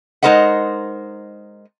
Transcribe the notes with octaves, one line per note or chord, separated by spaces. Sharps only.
G#3 D#4 A#4 C5 D#5 F#5